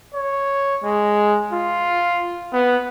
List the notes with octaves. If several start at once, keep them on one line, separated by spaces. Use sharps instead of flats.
C#5
G#3
F4
B3